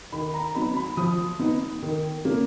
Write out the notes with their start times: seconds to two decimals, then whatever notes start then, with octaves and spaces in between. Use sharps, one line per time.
0.12 D#3 B5
0.34 A#5
0.55 F#3 B3 D#4 B5
0.76 B5
0.97 F3 D#6
1.40 B3 D#4
1.83 D#3
2.25 A#3 C#4